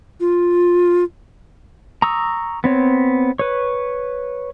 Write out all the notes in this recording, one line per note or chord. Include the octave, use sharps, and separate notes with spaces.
F4
A#5 C#6 D#6 E6
B3 C4 C#5
B4 C#5